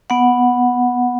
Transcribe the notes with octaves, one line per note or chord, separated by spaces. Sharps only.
B3 F#5